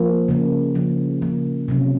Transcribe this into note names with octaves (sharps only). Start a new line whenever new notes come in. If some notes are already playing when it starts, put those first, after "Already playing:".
Already playing: F3 A#3
C#3 F3 A#3
C#3 F3 A#3
C#3 F3 A#3
C3 F#3 C#4